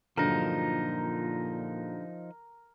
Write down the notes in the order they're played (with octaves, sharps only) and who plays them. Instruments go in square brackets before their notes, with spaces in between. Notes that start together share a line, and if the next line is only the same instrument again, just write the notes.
[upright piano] G2 D3 F#3 [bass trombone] A#2 [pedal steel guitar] F3 D#4 [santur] A#4